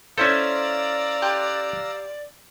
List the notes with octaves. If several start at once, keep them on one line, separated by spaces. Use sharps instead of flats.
C#4 E4 A4 C5 D5 F5 A#5 E6
G4 C6 F#6